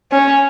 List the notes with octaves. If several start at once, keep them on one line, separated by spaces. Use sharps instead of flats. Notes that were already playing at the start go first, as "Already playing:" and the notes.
C#4